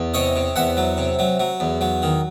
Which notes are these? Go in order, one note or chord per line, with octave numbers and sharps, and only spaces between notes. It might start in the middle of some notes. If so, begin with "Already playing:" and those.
Already playing: E2
C3 C#5 D#5
C3
E2 E5 F#5
F#3
C3
F#3
F#3
E2
F#3
D#3